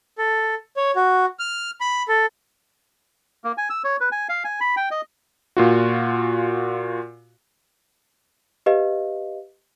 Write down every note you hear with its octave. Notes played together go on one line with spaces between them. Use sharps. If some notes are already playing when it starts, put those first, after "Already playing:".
A4
C#5
F#4
F6
B5
A4
A#3
G#5
E6
C#5
B4
G#5
F5
G#5
B5
G5
D#5
A#2 F4 F#4
G4 B4 D#5 F5